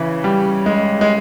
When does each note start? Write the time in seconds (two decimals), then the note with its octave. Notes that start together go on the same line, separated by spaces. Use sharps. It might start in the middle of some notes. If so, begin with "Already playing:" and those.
Already playing: C#3 E3
0.24 G3
0.66 G#3
1.01 G#3